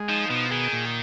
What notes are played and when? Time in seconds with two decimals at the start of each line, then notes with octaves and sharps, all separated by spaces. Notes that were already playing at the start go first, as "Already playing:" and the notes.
Already playing: G#3
0.09 F3 D#4
0.30 B2 F3
0.51 D#3 G#4
0.72 A#2